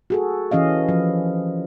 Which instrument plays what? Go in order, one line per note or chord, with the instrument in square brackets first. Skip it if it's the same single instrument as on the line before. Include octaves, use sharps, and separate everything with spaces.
[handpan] F#4 G#4 A4
E3 C#4 D#5 F5
F3